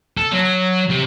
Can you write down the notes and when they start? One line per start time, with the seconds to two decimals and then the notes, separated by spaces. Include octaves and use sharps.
0.17 A4
0.32 F#3
0.90 C3